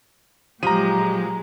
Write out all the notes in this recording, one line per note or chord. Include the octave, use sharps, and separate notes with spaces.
A#2 F3 F#3 G#3 G4 A#5 D#7